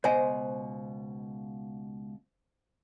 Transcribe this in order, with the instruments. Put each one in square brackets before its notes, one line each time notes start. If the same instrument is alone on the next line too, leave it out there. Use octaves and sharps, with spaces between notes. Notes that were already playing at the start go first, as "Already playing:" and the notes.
[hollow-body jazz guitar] C#2 B2 D#5 [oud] C5 [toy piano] C#5 G#5